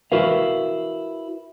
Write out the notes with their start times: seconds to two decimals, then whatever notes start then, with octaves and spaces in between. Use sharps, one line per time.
0.12 E4 F#4 A#4 B4 F5